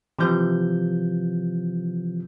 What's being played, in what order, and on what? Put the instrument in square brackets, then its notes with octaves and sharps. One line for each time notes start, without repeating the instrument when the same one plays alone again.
[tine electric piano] C3 E3 F3 G6